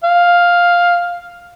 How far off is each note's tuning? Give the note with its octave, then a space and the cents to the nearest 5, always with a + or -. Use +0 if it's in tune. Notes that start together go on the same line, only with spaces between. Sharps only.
F5 +5